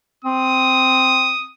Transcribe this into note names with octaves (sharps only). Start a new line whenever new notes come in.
C4 D#6